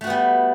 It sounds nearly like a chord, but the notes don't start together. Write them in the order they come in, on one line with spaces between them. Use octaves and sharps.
A3 F#4 B3 G3